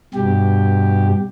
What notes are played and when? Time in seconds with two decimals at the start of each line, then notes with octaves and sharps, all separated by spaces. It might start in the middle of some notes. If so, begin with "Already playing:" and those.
0.14 G2 B2 G4